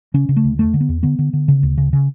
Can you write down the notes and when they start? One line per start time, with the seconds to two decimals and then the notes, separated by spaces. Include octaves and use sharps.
0.14 C#3 C#4
0.29 C#3
0.36 A3
0.44 D2
0.59 E2 A3
0.74 D3
0.81 B3
0.89 E2
1.03 D3 B3
1.19 D3
1.33 D3
1.48 C#3
1.63 D2
1.78 C#3
1.93 C#3